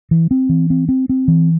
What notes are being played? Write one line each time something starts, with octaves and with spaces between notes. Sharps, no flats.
E3
C4
E3
C4
C4
C4
E3